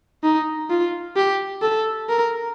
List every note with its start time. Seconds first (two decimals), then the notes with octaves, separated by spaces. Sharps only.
0.24 D#4
0.70 F4
1.16 G4
1.62 A4
2.09 A#4